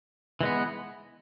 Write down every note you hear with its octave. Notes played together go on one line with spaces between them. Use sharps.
E3 G#3 B3